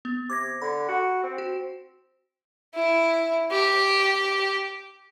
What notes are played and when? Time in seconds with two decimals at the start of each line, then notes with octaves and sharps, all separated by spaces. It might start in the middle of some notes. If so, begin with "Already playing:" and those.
0.05 B3
0.30 C3 D6 G#6 A#6
0.62 D3 B5
0.89 F#4
1.23 C4
1.38 F#4
2.75 E4
3.51 G4